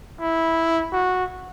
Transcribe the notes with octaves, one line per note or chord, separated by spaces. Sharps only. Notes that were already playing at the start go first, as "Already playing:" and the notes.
E4
F#4